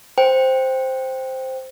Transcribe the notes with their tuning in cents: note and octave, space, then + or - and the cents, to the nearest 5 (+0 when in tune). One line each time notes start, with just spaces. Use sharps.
C5 +0 G5 +0